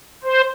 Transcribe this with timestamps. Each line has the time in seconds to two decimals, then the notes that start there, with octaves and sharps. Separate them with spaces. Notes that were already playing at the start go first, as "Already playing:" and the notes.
0.24 C5